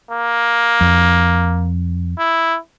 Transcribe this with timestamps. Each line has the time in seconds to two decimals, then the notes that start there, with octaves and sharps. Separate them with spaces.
0.11 A#3
0.81 F2
2.19 E4